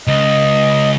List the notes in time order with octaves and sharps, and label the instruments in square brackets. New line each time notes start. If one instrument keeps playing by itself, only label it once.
[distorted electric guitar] C#2 [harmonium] D#5